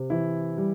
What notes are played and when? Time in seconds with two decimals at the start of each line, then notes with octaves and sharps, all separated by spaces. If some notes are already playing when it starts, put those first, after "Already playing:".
Already playing: C3
0.10 E3 E4
0.58 G3